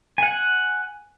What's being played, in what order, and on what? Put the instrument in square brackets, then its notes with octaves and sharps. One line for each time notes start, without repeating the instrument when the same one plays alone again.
[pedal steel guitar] F#5 G#5